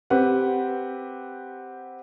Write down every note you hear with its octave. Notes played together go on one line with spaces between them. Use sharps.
C4 G4 B4 F#5